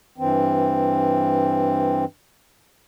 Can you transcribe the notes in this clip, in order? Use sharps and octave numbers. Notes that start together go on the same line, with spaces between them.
G2 E3 C4